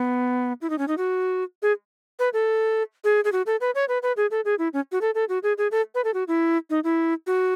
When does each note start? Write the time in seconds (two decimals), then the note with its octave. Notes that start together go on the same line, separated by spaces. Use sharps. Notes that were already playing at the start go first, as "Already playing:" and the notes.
Already playing: B3
0.62 E4
0.70 D#4
0.78 C#4
0.88 D#4
0.98 F#4
1.62 G#4
2.19 B4
2.33 A4
3.04 G#4
3.24 G#4
3.32 F#4
3.46 A4
3.61 B4
3.75 C#5
3.89 B4
4.03 B4
4.17 G#4
4.31 A4
4.45 G#4
4.59 E4
4.74 C#4
4.92 F#4
5.01 A4
5.15 A4
5.29 F#4
5.43 G#4
5.58 G#4
5.71 A4
5.95 B4
6.04 A4
6.14 F#4
6.28 E4
6.70 D#4
6.84 E4
7.27 F#4